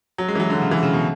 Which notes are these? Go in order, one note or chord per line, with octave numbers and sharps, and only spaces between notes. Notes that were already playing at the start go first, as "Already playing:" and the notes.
F#3
G#3
E3
F#3
D3
C#3
E3
C#3
B2